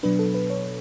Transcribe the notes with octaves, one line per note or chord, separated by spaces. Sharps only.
B2 F#3 B3 D4 B4
A4
B4
C#5